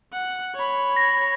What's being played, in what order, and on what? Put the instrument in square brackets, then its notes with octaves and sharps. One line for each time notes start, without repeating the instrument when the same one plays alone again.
[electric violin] F#5
C#5 B5
[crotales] A#6